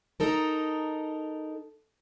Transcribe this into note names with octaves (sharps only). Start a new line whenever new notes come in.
D#4 A4 A#4